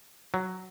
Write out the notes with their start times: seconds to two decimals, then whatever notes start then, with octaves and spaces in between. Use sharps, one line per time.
0.34 F#3